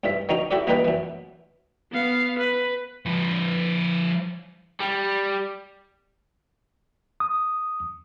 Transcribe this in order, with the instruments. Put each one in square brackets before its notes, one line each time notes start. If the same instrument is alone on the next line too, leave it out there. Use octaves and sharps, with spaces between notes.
[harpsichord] B1 G2 E5
D#3 F#3 C#4 D#4
E4 F#4 G4 A4 D5
A#2 E3 G3 D4 D#4 B4
F#2 E3
[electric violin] B3 F5
B4
[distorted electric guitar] F3 B4
[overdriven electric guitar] G3
[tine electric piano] D#6